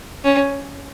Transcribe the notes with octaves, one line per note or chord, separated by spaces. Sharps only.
C#4